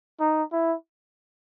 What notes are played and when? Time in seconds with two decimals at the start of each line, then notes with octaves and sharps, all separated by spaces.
0.20 D#4
0.52 E4